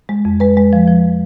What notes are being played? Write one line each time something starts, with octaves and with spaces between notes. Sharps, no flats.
G#3
F2
G#3 B4
G#3
F3
F3